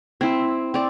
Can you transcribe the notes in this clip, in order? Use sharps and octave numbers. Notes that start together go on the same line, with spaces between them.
C4 E4
C4 D5